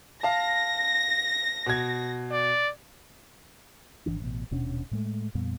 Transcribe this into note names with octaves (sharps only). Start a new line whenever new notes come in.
F5 A5 A#6
B2 G#6
D5
G#1 E2 E3 D4
A1 B2
D#1 B2 C#4 D4
A2 G#3 A3
F2 A#2 G3 B3